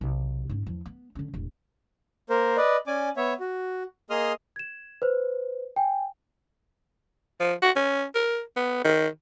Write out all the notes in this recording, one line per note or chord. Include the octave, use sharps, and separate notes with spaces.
B1 C3
G#2 C#4
E2 F3
B3
D3 C#4
E1 A1
A#3 A#4 C5
B4 D5 D#5
C#4 D5 G#5 D6
B3 C#5 E5
F#4
A#3 G#4 D#5 C6 D#6 F6
G#6 E7
B4 C5
G5 G#5
F3
F#4
C#4
A#4
B3
D#3